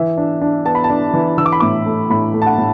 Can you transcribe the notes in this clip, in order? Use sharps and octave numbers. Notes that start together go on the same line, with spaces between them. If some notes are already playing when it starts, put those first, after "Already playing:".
Already playing: E3 E5
D4
D4
B3 A5
B5
A5
D4
E3
E3 E6
D6
B5
A2 D6
A3
A2 B5
A3
A5
F#5
A2